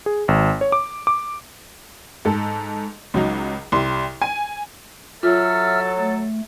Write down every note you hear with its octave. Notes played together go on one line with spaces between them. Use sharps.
G#4
G#1
C#5
D6
D6
G#2 A4
C#2 F#3 D#4
C2 G4 C6
G#5 D#7
F#3 F4 A4 E5 E6 F6
A3